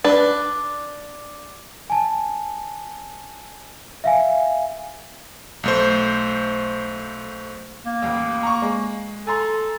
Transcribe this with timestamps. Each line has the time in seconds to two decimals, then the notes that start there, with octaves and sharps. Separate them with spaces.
0.04 D4 B4
1.90 G#5 A5
4.04 E5 F5 G#5
5.64 B1 A3 C5
7.86 A#3
8.02 A1 D#2
8.43 A#5 C#6
8.62 G#3
9.27 A4 G#5 A#5 C6